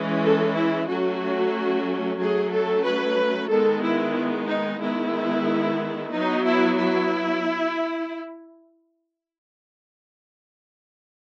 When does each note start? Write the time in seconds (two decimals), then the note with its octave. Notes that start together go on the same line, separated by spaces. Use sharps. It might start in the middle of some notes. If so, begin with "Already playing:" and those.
Already playing: E3 G#3 C#4
0.23 A4
0.55 E4
0.88 F#3 A3 C#4 F#4
2.19 F#3 A3 C#4 G#4
2.52 A4
2.84 B4
3.50 D#3 G#3 B3 A4
3.83 E4
4.48 D#4
4.81 D#3 G#3 B3 E4
6.12 F#3 B3 D#4
6.45 E4
6.78 E4